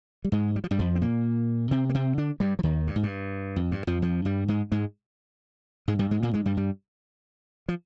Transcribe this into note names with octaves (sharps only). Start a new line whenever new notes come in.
G3
G#2 G#3
G3
F3
G2 G3
F2 F3
C4
A#2 A#3
C3 C4
A#3
C3 C4
D3 D4
G2 G3
F3
D#2 D#3
G2
G#2
G2
F2
G2
F2 F3
F2 F3
G2 G3
G#2 G#3
G#2 G#3
G#2 G#3
G2 G3
G#2 G#3
A#2 A#3
G#2 G#3
G2 G3
G2 G3
F3